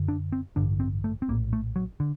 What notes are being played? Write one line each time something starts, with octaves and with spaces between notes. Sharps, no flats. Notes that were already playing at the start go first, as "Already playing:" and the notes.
Already playing: F#2 D3
D4
C4
A1 G2 D3 D4
C4
A3
C4
A#1 A2 A#3
A3
F#3
D3